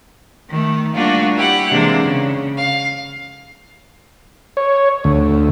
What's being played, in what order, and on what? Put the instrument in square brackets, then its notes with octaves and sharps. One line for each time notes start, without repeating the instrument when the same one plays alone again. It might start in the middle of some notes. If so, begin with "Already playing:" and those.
[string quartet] D#3 A3
G3 A3 A#3 D4 F4 F#4
E4 G4 F#5
C3 E3 G#3 A#3 D4
C#3
F5
[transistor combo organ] C#5
D2